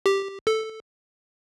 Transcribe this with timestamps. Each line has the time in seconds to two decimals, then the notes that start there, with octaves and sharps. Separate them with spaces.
0.06 G4
0.47 A4